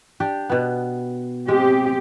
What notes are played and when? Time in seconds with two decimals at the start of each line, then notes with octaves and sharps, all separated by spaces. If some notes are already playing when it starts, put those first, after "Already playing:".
0.20 D4 G4
0.50 B2 B3
1.48 G#3 C4 G4